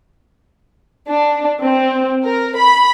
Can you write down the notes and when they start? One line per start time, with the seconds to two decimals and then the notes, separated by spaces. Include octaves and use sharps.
1.09 D4
1.61 C4
2.26 A#4
2.56 B5